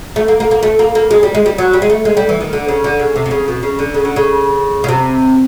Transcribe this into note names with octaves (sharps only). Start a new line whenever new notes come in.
A3
A#3
A#3
A#3
A3
A#3
A#3
G#3
G3
G#3
G3
F#3
G3
G#3
A3
G#3
G3
E3
D#3
D3
C#3
D3
C#3
C3
C3
C#3
B2
C#3
D3
C#3
D3
C#3
C#3
C3